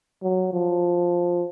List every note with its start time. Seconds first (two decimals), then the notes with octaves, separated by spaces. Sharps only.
0.23 F#3
0.53 F3